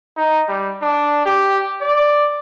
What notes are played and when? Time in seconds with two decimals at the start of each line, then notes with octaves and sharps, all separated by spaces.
0.17 D#4
0.49 G3
0.82 D4
1.25 G4
1.81 D5